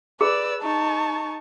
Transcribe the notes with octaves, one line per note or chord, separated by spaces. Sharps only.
G#4 B4 D5 E6
D#4 A5 C#6